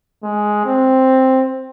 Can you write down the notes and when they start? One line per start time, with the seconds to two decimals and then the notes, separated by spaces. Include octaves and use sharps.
0.23 G#3
0.65 C4